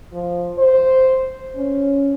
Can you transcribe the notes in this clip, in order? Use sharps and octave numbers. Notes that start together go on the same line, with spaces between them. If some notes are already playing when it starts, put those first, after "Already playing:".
F3
C5
C#4